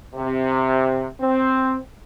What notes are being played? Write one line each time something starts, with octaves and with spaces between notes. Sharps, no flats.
C3
C4